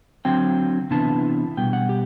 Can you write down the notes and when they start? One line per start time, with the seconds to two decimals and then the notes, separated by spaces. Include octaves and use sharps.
0.25 D3 F#3 C4 G5
0.91 C3 E3 B3 D4 A5
1.57 B2 G3 B3 G5
1.73 F#5
1.89 G4